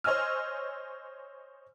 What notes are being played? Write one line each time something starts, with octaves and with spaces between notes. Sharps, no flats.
C5 C#5 D#5 G#5 E6 F6